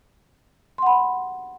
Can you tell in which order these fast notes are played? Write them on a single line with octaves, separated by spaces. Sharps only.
C6 F#5 B5